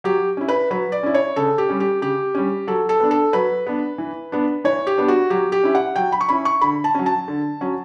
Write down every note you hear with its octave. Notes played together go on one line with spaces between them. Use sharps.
F#3 G4
C#4 E4
B4
F#3 B4
D5
C#4 E4
C#5
C#3 A4
G4
G3 C#4
G4
C#3 G4
G3 C#4
F#3 A4
A4
B3 D4
A4
F#3 B4
B3 D4
E3
B3 D4
E3 C#5
G4
B3 D4
F#4
F#3 G4
G4
C#4 E4
F#5
F#3 G5
B5
C#6
C#4 E4 B5
C#6
D3 B5
A5
F#3 C#4
A5
D3
F#3 C#4